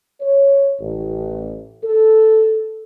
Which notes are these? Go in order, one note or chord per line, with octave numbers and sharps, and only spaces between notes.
C#5
A1
A4